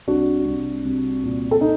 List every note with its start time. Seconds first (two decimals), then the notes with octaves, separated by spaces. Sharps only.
0.07 C2 D4 F#4
0.45 C2
0.85 C2
1.24 A#2
1.51 A4
1.61 D#4